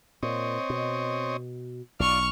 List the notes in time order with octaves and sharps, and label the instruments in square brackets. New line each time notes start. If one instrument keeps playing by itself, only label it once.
[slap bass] A#2 [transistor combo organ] C4 C#5 D#5
[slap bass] B2
[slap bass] B1 [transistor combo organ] F4 D5 [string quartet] C#6 F6